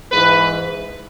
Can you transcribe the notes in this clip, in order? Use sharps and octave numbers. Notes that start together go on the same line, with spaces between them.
G#2 E3 B4